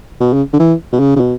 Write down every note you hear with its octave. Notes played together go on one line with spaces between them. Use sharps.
B2
C#3
D3
E3
B2
C#3
C#3
B2